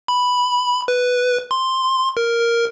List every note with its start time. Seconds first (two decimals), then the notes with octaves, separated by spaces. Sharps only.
0.08 B5
0.88 B4
1.51 C6
2.17 A#4
2.40 A#4